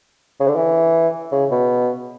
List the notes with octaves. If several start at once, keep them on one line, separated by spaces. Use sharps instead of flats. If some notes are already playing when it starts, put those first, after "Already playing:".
C#3
D3
E3
C#3
B2